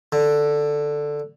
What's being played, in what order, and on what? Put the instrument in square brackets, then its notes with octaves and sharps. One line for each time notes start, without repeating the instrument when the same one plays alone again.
[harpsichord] D3